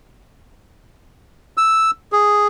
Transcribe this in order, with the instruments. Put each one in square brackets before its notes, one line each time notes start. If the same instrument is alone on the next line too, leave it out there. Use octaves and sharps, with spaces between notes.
[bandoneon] E6
G#4